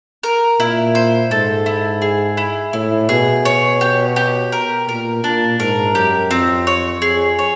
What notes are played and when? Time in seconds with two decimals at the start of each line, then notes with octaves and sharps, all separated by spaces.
0.23 A#4
0.60 A#2 E4
0.95 C5
1.31 G#2 A4
1.66 E4
2.02 G#4
2.37 E4
2.73 A2 E4
3.09 B2 G#4
3.45 C#5
3.81 G4
4.16 G4
4.52 A#4
4.88 A#2 A#4
5.24 A#2 D4
5.60 G#2 A#4
5.95 F#2 G4
6.31 F2 C4
6.67 C#5
7.02 F2 G#4
7.39 C#5